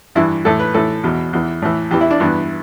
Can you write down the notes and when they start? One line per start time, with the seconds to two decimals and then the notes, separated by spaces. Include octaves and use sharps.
0.15 G2 E3 E4
0.45 A2 E3 A4
0.59 B4
0.74 A2 E3 A4
1.04 E2 B2
1.33 E2 E3
1.62 A2 E3
1.91 E2 E3 G4
2.01 E4
2.11 D4
2.20 G2 E3 B3